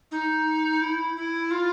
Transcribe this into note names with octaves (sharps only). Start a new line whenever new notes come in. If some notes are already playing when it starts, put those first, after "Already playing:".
D#4
E4
E4
F4